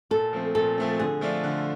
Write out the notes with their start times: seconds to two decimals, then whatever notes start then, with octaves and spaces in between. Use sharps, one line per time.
0.11 A#2 A4
0.33 F3 A3 C4
0.55 A#2 A4
0.78 F3 A3 C4
0.99 D3 G#4
1.21 F3 A3 D4 F4
1.44 D3